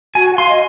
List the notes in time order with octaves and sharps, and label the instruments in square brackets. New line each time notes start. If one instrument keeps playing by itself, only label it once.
[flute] F#4 [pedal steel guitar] G#5
[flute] F#5
[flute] F5 [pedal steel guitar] C6
[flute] D#5